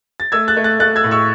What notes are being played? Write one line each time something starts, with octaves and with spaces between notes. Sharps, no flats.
A6
A3 E6 G#6
F#6 A6
A3
F#6 A6
A3 F#6 A6
E6 G#6
A2
C#6 E6